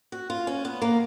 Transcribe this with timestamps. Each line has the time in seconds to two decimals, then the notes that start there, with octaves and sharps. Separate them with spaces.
0.12 F#4
0.30 F4
0.47 C#4
0.65 B3
0.82 A#3